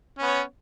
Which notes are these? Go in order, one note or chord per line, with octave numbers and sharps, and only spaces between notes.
B3 C#4 C#5